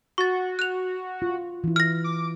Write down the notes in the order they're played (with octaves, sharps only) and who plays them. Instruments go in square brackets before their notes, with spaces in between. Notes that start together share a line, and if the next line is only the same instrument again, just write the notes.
[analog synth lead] F#4 [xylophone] C#6 A6
[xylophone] F#6 F7
[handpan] F4
E3 E4
[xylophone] F6 A#6
[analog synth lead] D6